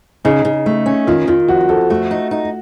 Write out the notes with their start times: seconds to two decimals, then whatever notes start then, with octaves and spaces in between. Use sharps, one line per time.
0.25 C#3 D#4
0.45 C#3
0.66 A3
0.86 C#4
1.07 D#3 F4
1.27 D#3 F4
1.48 F2 F#4
1.69 F2 A4
1.90 A3 F#4
2.11 D#4
2.31 D#4